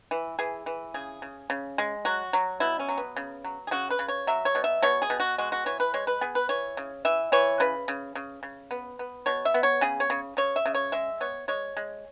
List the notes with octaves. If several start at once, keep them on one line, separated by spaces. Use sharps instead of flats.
E3
E3 G#4
E3
C#3 G#4
C#3
C#3
G#3
F#3 F#4
F#3
B2 E4
C#4
F#3
B3
C#3
F#3
G#4
C#3 F#4
B4
C#3
C#5
F#3 E5
C#5
B2
E5
B2 C#5
G#4
B2
F#4
G#3 F#4
F#4
E3 C#5
B4
G#3 C#5
B4
B3 G#4
B4
E3 C#5
C#3
E3 E5
E3 C#5
C#3 B4
C#3
C#3
C#3
B3
B3
B2 C#5
E5
B3
C#5
C#3 G#4
C#5
C#3
C#3 C#5
E5
C#3
C#5
G#3 E5
B3 C#5
G#3 C#5
G#3